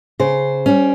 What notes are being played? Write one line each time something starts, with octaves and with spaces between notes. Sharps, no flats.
C#3 C5
G3 C#4